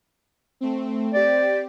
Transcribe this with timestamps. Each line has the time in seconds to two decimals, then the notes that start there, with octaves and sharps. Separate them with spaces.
0.61 A3 C4
1.14 C4 G4 D5